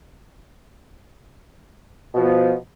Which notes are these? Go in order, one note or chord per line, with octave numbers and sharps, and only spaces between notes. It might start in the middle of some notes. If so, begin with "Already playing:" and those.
B2 F3 B3